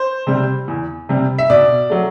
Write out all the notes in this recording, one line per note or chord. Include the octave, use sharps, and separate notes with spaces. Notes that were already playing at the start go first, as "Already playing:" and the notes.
Already playing: C5
C3 G3
E2
C3 G3
E5
B2 D5
F#3 A3